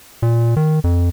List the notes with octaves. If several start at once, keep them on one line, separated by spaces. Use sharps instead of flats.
A#2
D#3
F2